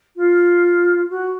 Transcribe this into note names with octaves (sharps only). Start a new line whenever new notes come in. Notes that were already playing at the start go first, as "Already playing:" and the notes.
F4
F#4